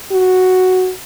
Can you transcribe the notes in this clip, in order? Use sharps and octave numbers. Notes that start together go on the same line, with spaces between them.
F#4